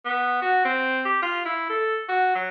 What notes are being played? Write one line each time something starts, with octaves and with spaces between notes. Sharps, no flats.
B3
F#4
C4
G4
F4
E4
A4
F#4
F#3